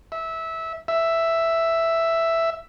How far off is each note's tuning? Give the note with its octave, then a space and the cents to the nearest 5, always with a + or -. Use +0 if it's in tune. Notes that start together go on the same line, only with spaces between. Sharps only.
E5 -15
E5 +5